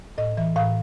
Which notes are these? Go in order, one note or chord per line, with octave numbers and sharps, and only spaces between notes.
A2 D#5
E3 E5
A2 F5